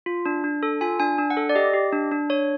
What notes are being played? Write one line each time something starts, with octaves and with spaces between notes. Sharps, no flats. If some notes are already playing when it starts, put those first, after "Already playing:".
F4
D4
D4
A4
F4 G#5
D4 G#5
D4
F#5
A4
D5
G4 D#5
G4
D4
D4
D4 C#5